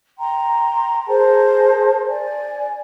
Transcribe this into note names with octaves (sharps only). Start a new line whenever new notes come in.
G5 A#5 C6
G#4 A#4 C5 A5
D5 G#5